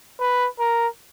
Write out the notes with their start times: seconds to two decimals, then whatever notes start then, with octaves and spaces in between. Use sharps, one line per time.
0.20 B4
0.60 A#4